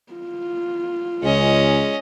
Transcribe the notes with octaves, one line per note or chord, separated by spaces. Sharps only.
F4
C#2 G#3 C#4 D#5